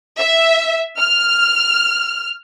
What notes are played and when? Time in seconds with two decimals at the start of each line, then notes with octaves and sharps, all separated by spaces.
0.20 E5
1.00 F6